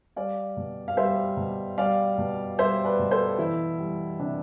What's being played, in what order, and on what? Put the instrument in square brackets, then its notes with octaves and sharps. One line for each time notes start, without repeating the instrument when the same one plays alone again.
[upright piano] G3 D5 F5
B2
F5
G3 C5 E5
B2
G3 D5 F5
B2
G3 C5 E5
B4 D5
B2
A4 C5
E3 E4
G3
C3 D4